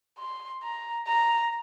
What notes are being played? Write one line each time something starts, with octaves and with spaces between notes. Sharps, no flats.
C6
A#5
A#5